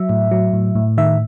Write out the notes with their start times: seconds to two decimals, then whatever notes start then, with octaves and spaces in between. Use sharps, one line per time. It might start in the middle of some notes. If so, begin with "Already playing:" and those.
Already playing: F#3 E5
0.09 A2
0.31 F#3
0.53 A2
0.75 A2
0.98 D#3 E5